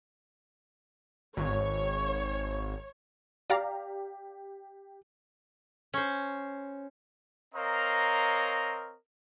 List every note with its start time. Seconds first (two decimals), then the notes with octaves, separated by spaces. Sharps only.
1.37 G#1 C#5
3.50 G4 D5 F5 A#5
5.94 C#4 C5
7.54 C4 A#4 C#5 D#5 F5 A#5